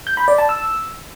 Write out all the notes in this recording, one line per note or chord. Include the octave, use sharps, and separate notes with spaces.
G6
B5
D5
A5
E6